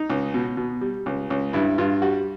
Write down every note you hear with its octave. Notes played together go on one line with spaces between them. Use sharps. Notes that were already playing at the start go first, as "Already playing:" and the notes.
Already playing: D#4
C#2
B2
B2
G3
C#2
C#2
G2 E4
G2 F4
G3 F#4